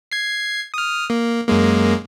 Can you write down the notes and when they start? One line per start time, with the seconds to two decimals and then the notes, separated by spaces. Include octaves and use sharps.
0.12 G#6 C7
0.74 D#6 F6
1.10 A#3
1.47 F#2 G#3 A#3